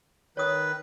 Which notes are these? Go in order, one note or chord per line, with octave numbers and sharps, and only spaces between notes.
D#3 B4 C#5 D#6